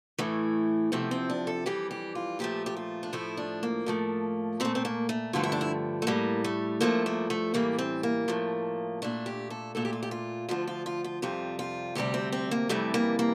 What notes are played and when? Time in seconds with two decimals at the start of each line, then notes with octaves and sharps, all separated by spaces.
0.18 A2 E3 A3
0.92 E2 C3 F3 A3
1.11 C4
1.30 D4
1.47 A4
1.66 F2 E3 G3 G4
1.91 G4
2.15 F4
2.39 A#2 F3 A3 G4
2.66 G4
2.77 F4
3.03 D4
3.13 A2 F3 A3 E4
3.37 D4
3.63 A#3
3.86 A2 F3 A3
4.60 A#2 A3 C4
4.75 C4
4.85 A#3
5.09 A3
5.33 G2 D3 F3 A3 F4
5.43 E4
5.52 D4
5.61 E4
6.02 A3
6.07 A2 G3 A#3
6.44 A3
6.80 G2 F3 A3 A#3
7.06 A#3
7.30 A3
7.54 A2 E3 G3 A#3
7.78 C4
8.03 A#3
8.28 A2 F3 A3
9.02 A#2 A3 D4
9.26 G4
9.50 A4
9.75 A#2 A3 A4
9.85 G4
9.93 F4
10.03 G4
10.11 F4
10.49 D2 D3 F3 F4
10.67 F4
10.86 F4
11.04 F4
11.22 F2 C3 G3 F4
11.59 F4
11.95 D2 C3 G3 G4
12.14 C4
12.32 C4
12.51 A#3
12.69 F2 C3 E3 G3 A3
12.94 A#3
13.19 A#3